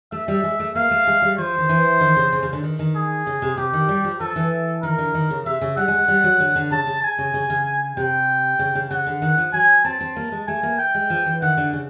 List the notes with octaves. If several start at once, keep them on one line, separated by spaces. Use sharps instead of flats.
A3 E5
G3
G#3
A3
A#3 F5
A3
G#3
G3
F3 C5
D#3
E3
D#3
C#3
C#3
C#3
D3
D#3
D#3
G#4
C#3
C3
C3 G4
D#3
G3
F3
F3 A4
E3
D#3 A#4
D3
D#3
C#3
C3 E5
C#3
G3 F#5
G#3
G#3
G3
F#3
D3
D3
C#3 A5
C#3
G#5
C#3
C#3
C#3
C3 G5
C#3
C#3
C#3 F#5
D3
D#3
F3
F#3 G#5
C4 A5
C4
A#3
G#3
A3 G#5
A#3
G5
G#3
F3
E3
D#3 F#5
D3
C#3